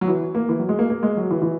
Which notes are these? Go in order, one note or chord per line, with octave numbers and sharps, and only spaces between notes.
F#3
E3
A#3
E3
F#3
G#3
A#3
A#3
G#3
F#3
E3
E3